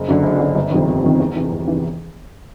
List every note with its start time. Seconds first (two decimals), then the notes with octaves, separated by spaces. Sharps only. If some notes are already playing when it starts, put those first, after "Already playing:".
Already playing: F#1
0.08 F#2 D3
0.23 F#1
0.40 F#2 D3
0.55 G1
0.71 F2 C3 D#3
0.87 G1
1.03 F2 C3 D#3
1.19 E2
1.36 C3 E3
1.51 E2
1.67 C3 E3